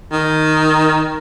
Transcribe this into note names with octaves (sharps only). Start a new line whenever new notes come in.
D#3